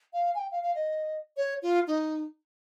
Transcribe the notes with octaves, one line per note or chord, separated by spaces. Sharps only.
F5
G#5
G5
F5
F5
D#5
C#5
F4
D#4